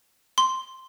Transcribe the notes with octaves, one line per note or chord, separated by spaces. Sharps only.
C6